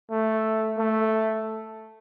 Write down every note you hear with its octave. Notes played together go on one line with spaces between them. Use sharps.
A3
A3